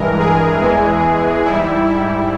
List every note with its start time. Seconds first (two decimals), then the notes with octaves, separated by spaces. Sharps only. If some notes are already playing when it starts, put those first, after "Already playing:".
Already playing: G2 E3 G#3 A#4
0.19 G#4
0.61 E2 E3 G#3
1.45 G#2 G3 E4
1.88 E4